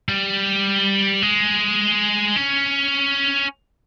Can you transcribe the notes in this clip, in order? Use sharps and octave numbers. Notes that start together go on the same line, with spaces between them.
G3
G#3
C#4